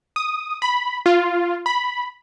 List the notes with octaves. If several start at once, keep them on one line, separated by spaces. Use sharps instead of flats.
D#6
B5
F4
B5